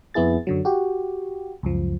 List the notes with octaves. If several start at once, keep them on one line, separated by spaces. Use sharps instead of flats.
F2 B3 E4 G#4 A6
F#2 D3 F#3
F#4 G4
C#2 F#2 F3